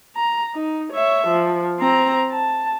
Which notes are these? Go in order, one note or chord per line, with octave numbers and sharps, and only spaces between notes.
A#5
D#4
C#5 E5
F3
C4 A#5
A5